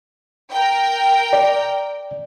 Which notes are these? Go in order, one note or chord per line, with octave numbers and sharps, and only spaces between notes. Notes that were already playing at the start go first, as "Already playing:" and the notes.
A#4 G5
D5